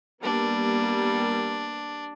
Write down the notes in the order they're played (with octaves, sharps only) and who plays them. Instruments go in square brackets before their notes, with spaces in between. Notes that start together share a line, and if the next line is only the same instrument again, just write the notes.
[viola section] G3 A#3 B3 [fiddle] D4